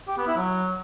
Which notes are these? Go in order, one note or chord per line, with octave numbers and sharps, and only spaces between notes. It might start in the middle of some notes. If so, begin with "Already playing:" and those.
G4
B3
E4
F#3